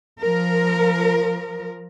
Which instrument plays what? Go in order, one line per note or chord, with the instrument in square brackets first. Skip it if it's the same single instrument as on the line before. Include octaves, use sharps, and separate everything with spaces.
[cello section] F3 A#4